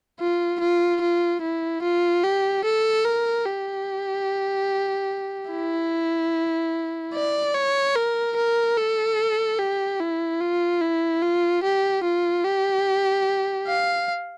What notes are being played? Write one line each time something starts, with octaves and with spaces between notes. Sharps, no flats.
F4
F4
F4
E4
F4
G4
A4
A#4
G4
E4
D5
C#5
A#4
A#4
A4
G4
E4
F4
E4
F4
G4
F4
G4
F5